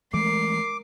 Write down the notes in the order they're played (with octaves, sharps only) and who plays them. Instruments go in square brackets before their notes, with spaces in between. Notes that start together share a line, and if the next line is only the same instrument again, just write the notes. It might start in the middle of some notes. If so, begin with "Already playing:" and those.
[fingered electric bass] E3 G#3 A3 [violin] A#4 C7 [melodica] D6